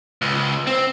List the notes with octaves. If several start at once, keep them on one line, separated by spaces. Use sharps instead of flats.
C#2
C4